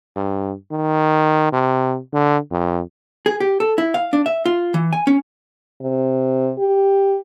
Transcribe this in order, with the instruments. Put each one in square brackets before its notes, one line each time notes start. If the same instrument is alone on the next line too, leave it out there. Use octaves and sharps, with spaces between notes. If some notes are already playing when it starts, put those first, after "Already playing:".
[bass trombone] G2
D#3
C3
D3
F2
[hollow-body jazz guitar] G#4
G4
A4
E4
F5
D4
E5
F4
E3
G#5
C#4
[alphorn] C3
G4